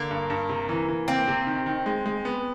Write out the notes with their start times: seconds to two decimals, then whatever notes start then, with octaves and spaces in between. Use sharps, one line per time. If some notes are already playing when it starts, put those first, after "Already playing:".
Already playing: D3 A#3
0.11 G2
0.30 G2
0.49 C3
0.69 E3
0.88 E3
1.08 A#3 C4
1.28 C3
1.47 D#3
1.66 D#3
1.86 G#3
2.06 G#3
2.25 B3